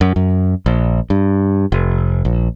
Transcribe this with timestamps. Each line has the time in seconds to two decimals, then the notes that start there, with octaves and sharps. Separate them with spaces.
0.01 F#2
0.16 F#2
0.66 A#1
1.10 G2
1.72 F1
2.25 A#1